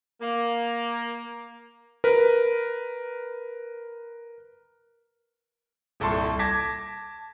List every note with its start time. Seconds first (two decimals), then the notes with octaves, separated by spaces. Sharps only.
0.21 A#3
2.04 A#4 B4
6.00 D#1 C2 A4 A5 C6 C#6
6.39 A5 D6 G#6 A#6 B6